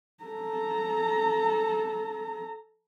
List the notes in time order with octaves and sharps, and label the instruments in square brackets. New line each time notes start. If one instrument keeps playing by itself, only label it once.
[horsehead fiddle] A4 A#5